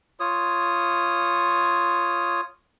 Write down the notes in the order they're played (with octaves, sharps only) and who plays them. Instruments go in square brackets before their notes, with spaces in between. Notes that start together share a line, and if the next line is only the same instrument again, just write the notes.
[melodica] F4 C#5 D#6